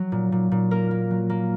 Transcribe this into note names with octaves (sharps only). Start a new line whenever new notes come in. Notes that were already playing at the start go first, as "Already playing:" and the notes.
Already playing: F#3
A#2
A#2
A#2
A#3 A#4
A#3
F#3
A#3